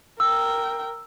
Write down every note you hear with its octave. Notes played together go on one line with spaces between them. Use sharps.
A#4 G5 E6